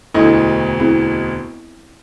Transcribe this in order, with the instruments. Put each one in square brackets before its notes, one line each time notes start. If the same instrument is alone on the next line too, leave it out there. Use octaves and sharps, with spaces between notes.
[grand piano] E1 D2 D#5 [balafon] D4 E4 A4
[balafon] C4 E4 G#4